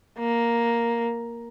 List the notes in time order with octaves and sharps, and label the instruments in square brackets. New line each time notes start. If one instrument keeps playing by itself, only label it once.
[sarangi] A#3